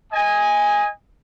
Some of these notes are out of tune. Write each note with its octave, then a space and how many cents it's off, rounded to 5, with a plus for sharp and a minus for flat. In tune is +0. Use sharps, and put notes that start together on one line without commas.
D#5 +20 G#5 -10